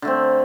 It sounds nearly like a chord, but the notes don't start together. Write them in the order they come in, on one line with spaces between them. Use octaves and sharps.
D3 A3 C4